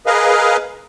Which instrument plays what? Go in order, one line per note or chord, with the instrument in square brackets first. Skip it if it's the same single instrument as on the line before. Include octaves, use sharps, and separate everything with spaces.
[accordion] G#4 A#4 B4 D#5 F5